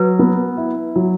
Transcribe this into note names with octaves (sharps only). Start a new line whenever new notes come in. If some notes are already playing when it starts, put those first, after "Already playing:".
Already playing: F#3 B4
B3
E4
F#3